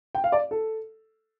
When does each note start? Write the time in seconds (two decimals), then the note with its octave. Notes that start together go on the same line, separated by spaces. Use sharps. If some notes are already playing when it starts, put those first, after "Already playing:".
0.15 G5
0.24 F5
0.32 D5
0.51 A4